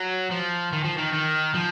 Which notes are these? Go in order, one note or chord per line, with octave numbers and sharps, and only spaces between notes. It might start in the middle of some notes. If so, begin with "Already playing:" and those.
Already playing: F#3
F3
D#3
F3
D#3
D#3
F3